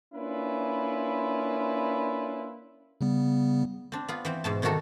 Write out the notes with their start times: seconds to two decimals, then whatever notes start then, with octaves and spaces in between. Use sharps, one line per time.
0.14 A#3 C#4 D4 E4 F4 B4
3.01 C#3 G3 B3
3.92 C4 D4
4.08 B3 F4
4.25 E3 C4
4.44 G#2 B2 A5
4.62 C3 D#3 G3 F#4 A4 A#5